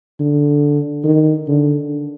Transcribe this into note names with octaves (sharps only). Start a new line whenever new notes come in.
D3
D#3
D3